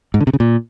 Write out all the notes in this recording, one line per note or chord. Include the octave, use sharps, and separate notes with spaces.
G#2
D3
C3
C#3
A#2